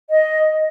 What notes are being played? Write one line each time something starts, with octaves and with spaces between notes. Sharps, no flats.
D#5